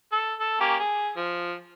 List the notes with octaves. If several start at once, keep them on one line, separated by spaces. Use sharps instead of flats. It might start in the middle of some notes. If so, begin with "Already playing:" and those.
A4
A4
A#3 C#4 G4
G#4
F3